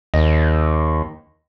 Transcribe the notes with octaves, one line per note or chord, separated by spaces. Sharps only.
D#2 D#5